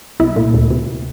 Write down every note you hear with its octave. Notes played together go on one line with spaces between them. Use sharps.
C2 E4
A#2
D2
C3